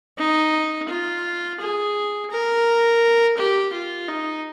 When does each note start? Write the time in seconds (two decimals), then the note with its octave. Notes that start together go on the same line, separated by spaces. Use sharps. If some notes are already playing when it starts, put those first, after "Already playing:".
0.18 D#4
0.89 F4
1.61 G#4
2.31 A#4
3.37 G4
3.73 F4
4.08 D#4